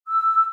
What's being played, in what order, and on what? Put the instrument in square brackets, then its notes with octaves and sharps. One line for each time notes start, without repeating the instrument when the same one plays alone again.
[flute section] E6